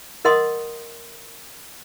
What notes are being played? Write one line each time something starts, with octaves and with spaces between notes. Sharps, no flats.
A#4 D#5 F#5 C6 D#6